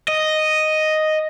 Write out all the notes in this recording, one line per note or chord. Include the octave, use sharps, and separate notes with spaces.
D#5